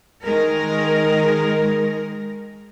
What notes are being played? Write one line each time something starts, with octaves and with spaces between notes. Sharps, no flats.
D#3 G#3 A#4